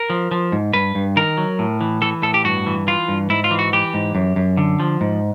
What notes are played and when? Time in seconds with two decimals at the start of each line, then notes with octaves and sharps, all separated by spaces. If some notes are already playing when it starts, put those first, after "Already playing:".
Already playing: A#4
0.10 F3
0.31 F3
0.52 G#2
0.73 G2 B4
0.95 G2
1.16 D#3 A#4
1.37 F#3
1.59 A2
1.81 E3
2.02 E3 A4
2.22 A2 A4
2.34 G4
2.44 G2 F#4
2.66 E3
2.87 E3 F4
3.08 G2
3.30 G#2 E4
3.44 F4
3.51 E3
3.59 F#4
3.73 E3 G4
3.94 G#2
4.15 F#2
4.36 F#2
4.57 D3
4.80 F3
5.01 G#2